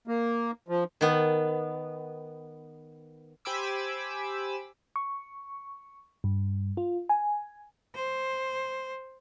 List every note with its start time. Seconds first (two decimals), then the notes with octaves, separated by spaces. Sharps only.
0.07 A#3
0.68 F3
1.01 D#3 B3
3.45 G4 C5 G#5 B5 D6 E6
4.96 C#6
6.24 G2
6.77 F4
7.09 G#5
7.95 C5